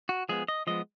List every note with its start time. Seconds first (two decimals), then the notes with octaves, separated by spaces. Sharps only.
0.09 F#4
0.29 F3 G#3 B3 G#4
0.48 D#5
0.67 F3 G#3 B3 D#5